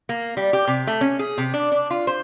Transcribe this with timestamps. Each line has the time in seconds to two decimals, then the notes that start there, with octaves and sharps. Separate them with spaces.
0.09 A#3
0.37 G3
0.53 G4
0.67 C3
0.87 A3
1.01 C#4
1.19 G#4
1.38 C3
1.54 D4
1.72 D4
1.91 F4
2.07 C5